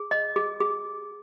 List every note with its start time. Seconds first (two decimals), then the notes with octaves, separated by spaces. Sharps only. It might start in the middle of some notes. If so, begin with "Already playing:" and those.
Already playing: G#4
0.11 D#5
0.36 G#4
0.60 G#4